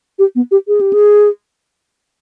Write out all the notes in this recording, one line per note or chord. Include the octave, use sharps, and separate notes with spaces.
G4
B3
G4
G#4
G4
G#4